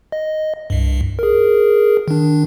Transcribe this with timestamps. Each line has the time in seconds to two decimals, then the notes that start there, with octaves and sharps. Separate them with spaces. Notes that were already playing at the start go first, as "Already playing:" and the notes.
0.12 D#5
0.70 C2 G2
1.19 G#4 A#4
2.08 D#3 D4